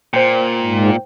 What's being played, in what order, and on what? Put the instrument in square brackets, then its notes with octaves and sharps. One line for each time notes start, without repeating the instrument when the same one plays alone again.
[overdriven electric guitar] A#2 [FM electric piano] C5 G5
[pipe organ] G#2